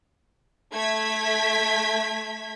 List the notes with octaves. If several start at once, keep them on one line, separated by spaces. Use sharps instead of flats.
A3 G#6 B6